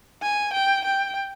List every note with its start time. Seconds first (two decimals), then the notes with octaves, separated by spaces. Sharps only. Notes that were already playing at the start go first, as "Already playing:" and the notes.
0.22 G#5
0.53 G5
0.85 G5